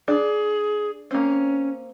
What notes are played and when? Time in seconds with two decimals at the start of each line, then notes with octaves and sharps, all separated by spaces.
0.08 D4 G#4
1.11 A#3 C4 C#4